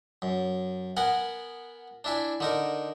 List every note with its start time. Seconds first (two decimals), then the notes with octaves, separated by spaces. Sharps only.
0.22 F#2
0.97 B3 A#4 F#5 G#5
2.04 D4 E4 G#5
2.40 D3 D#4 A#4